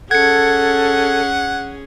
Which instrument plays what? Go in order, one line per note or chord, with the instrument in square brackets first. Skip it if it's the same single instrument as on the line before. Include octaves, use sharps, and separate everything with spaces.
[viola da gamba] C#4 G#4 [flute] A4 [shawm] F#5 [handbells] G#6 C#7